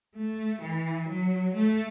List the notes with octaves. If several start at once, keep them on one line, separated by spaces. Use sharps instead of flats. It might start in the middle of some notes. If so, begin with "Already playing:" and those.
A3
E3
F#3
A3